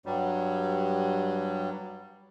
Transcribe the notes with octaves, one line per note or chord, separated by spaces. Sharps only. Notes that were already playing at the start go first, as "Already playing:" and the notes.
G2 F#3 G3